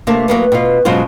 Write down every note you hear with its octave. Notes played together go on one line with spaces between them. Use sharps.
C3 A3 A#3 D4
F#3 A#3 B3
B2 F4
F#2 B2 F#3 G#3 F4 C5